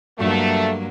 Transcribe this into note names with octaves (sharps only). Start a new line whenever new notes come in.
G2 F#3 A3 A#3